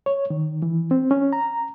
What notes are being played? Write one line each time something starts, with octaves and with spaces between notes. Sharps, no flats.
C#5
D#3
E3
C4
C#4
A#5